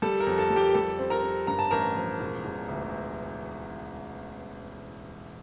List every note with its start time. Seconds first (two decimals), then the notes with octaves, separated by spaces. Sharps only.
0.02 G3 A4 A5
0.20 A#4 A#5
0.27 F2
0.38 A4 A5
0.50 G3
0.56 G4 G5
0.74 G3 A4 A5
0.99 C4
1.10 A#4 A#5
1.23 C4
1.47 G2 A#5
1.59 A5
1.71 A1 A#4 A#5
1.95 F3
2.20 E1
2.45 E1
2.68 D2